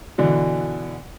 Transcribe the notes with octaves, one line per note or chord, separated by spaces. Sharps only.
B2 D3 E3